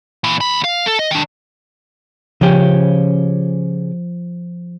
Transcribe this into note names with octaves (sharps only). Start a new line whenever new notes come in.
A#2 E3
D2 B5
F5
A4
D#5
D#3 D4
C#3 F3 C#4 G4